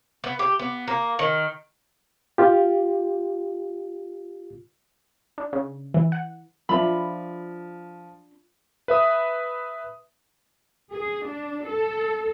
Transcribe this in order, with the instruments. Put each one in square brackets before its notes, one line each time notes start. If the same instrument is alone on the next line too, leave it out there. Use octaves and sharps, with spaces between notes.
[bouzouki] B3
G4
B3
A#3
D#3
[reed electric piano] F4 G4
[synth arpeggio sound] D4
C#3
E3
F#5
[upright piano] F3 [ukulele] D4 B5 [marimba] F4 E5
[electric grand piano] B4 E5 D#6
[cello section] G#4
D4
A4